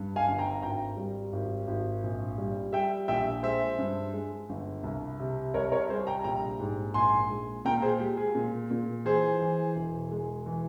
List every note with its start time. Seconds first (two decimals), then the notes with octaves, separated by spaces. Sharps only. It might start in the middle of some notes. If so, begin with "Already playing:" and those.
Already playing: G2
0.16 F5 G#5
0.28 G1
0.39 G5 A#5
0.62 G#1 G5 A#5
0.97 G3
1.33 G#1
1.67 G#1
2.03 A#1
2.38 G3
2.73 G3 E5 G5
3.08 A#1 E5 G5
3.43 G#3 C5 E5
3.78 G2
4.13 G#3
4.49 G1
4.83 C2
5.20 C3
5.54 C2 A#4 C#5
5.72 A#4 C#5
5.89 G3 G#4 C5
6.07 G5 A#5
6.24 A#1 G5 A#5
6.60 G#2
6.94 A#1 G#5 C6
7.30 G#3
7.65 A#2 G5 A#5
7.82 G#4 C5
8.00 G#3 G4
8.17 G#4
8.35 A#2
8.71 A#2
9.05 E3 G#4 C5
9.41 E3
9.76 E1
10.12 G#3
10.46 E3